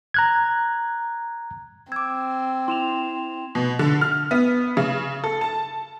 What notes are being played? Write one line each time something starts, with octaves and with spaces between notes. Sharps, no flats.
A#5 F#6 G#6
C4 D6 E6 G#6
E4 C6 E7 F7
B2
D3
F6
B3
C#3
A4
A5